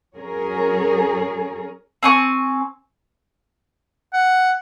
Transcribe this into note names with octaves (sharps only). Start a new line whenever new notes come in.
F#3 C#4 G#4 A#4 C#5
C4 G#5 C#6
F#5